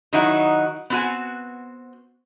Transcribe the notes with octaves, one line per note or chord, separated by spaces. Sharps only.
D#3 F#3 D#4 E4 F#4
B3 C4 F#4 G#5